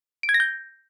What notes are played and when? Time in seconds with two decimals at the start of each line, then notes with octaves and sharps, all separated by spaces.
0.23 D7
0.29 G#6
0.34 A#6
0.40 G6